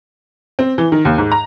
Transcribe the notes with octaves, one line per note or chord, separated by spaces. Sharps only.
C4
E3
D#3
D#2
G#2
A#5